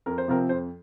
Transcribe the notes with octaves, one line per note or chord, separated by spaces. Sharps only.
F2 A#4
C5
C3 F3 C4 A#4
F2 C5